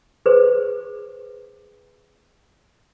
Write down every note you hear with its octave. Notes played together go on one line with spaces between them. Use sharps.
G#4 B4 C5